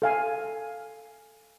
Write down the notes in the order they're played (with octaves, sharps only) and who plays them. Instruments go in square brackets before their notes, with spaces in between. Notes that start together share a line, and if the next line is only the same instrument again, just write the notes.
[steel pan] A4 F5 G#5